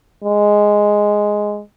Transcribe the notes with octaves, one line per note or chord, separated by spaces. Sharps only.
G#3